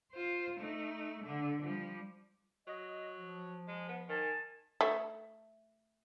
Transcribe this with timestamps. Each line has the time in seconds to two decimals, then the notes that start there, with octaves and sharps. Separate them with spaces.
0.12 F4 C5
0.60 A3 D#4
1.23 D3 D4
1.63 F3 G3
2.67 F#3 D#5
3.16 F3
3.68 G#3
3.89 B3
4.09 D#3 G#5 A5
4.81 A3